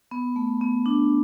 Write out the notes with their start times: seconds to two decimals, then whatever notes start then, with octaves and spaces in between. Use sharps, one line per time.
0.11 B3
0.36 A3
0.61 B3
0.86 D4